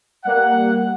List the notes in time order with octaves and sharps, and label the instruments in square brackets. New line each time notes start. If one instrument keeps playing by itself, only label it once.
[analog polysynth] G3 A#3 [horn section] F#5